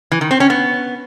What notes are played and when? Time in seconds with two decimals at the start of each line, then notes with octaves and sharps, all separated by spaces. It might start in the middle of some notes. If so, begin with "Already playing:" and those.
0.12 E3
0.21 D#3
0.31 C4
0.40 C#4
0.50 B3